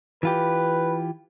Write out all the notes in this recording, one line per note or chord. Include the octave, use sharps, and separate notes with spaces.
E3 F4 G4 B4